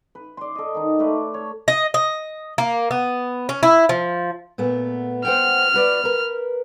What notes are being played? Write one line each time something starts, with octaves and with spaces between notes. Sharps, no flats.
B4
D5 C6
A4 D#5
D#3 D#4
A3 B4 D5
C#5
D#5
D#5
A#3
B3
C#4
E4
F3
A#2 A3 B3
C5 F#5 G5 F6
F#4 B4 D5
A#4 B4